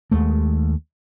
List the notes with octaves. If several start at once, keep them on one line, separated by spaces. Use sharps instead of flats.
D#2 G#3 A3